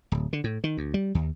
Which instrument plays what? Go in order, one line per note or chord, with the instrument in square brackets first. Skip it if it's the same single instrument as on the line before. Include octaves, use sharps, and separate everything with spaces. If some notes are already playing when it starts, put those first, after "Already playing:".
[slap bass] D1
D3
A2
D#3
D2
G3
D#2